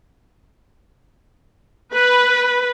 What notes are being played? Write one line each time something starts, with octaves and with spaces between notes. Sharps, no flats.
B4